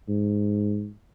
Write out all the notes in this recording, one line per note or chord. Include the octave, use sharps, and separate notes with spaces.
G#2